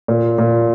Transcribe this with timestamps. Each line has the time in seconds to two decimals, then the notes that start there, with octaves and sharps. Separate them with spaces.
0.08 A#2
0.38 A#2